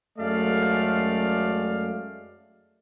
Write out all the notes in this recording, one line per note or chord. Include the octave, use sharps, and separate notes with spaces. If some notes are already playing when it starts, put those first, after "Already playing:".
F#2 G#3 A3 D5 F5